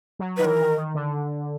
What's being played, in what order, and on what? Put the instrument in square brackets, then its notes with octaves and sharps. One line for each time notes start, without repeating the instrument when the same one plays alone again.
[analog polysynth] F#3
[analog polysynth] D#3 [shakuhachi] B4
[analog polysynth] E3 [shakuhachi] A#4
[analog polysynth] D#3
D#3
D3